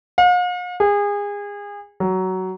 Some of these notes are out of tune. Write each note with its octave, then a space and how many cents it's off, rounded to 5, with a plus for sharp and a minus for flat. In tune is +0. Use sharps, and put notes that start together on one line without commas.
F5 +45
G#4 -30
F#3 +15